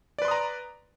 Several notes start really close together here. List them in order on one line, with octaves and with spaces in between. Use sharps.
D5 B4 C6 D#6 A#5